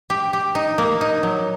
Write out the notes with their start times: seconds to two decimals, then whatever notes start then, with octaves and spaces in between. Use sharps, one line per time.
0.10 G4
0.33 G4
0.55 D#4
0.78 A#3
1.01 D#4
1.23 F#3